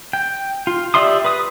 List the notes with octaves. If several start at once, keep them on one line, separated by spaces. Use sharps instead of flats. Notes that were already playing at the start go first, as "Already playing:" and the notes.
G5
F4
G4 D5 E5 C6 D#6
B4 D#6